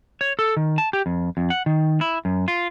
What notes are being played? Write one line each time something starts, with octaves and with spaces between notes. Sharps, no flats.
C#5
A4
D#3
A5
G4
F2
F2
F#5
D#3
E4
F#2
F4